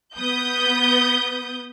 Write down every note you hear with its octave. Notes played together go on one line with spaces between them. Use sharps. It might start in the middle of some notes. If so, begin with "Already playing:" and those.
B3 D#6 G6